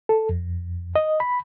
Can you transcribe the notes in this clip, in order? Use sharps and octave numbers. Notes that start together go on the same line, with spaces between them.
A4
F2
D#5
B5